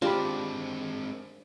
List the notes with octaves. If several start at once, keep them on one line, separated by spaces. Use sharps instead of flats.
G#3 C4 D4 F4 G4 B5